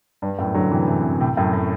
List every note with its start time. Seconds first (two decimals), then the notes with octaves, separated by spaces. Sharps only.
0.22 G2
0.39 F#2 A2
0.55 D3 F#3
0.71 C3 E3
0.88 C3 E3
1.20 A2 C3
1.37 F#2 A2
1.53 A2